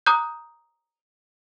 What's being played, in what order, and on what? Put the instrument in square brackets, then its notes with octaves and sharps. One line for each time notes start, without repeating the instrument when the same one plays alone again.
[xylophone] A#5 D6 D#6 F#6 G6